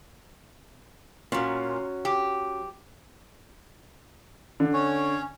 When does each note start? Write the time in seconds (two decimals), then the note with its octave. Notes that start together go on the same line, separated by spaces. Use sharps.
1.32 A#2 F#3 C#4
2.05 G4
4.60 D3
4.73 C#4 C#5